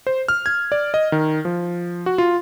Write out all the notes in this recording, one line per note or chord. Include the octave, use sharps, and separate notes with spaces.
C5
F6
G#6
D5
D#5
D#3
F3
F#4
F4